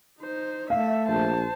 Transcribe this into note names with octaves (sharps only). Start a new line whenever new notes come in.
D#4 C5
A3 E5 F5
A#1 C5 A5